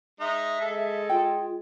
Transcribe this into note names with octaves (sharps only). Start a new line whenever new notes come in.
G#3 D#4 E5
G#3 A4
F4 G5